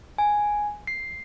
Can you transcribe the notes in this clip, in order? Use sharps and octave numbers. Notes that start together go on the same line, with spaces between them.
G#5
C7